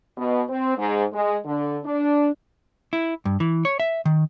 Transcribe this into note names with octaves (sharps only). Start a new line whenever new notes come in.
B2
C4
G#2
G#3
D3
D4
E4
G2
E3
C#5
E5
D#3